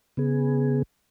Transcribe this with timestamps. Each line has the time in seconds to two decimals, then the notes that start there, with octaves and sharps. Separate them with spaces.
0.17 C#3 B3 G#4